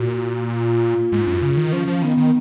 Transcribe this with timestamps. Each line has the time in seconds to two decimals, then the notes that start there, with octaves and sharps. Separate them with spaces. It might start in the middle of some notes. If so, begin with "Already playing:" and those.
Already playing: A#2 F#4
0.52 F4
1.12 G#2
1.27 F#2
1.42 C#3
1.57 D#3
1.72 F3 C#4
1.87 F3
2.02 D#3 B3
2.17 D#3